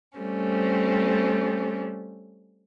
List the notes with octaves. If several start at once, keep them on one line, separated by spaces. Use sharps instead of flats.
G3 A3 C4 C#4